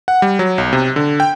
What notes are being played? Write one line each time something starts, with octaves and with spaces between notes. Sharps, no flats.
F#5
G3
F#3
B1
C3
D3
G5